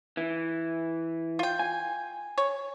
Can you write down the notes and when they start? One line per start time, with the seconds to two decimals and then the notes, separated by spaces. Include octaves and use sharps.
0.17 E3
1.39 F4 G5
1.59 G#5
2.38 C#5